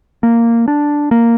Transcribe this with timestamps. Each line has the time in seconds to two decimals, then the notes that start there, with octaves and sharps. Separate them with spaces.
0.23 A#3
0.68 D4
1.11 A#3